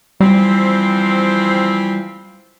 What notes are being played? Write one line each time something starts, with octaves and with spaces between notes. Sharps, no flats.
E3 F3 G3 C4